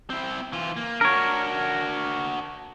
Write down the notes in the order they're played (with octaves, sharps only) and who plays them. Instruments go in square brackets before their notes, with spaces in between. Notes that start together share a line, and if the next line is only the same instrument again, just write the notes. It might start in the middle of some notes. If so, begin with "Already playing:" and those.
[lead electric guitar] C4 E4
E3 F4
A#3
[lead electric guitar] D4 F#4 [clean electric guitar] A#4 C#5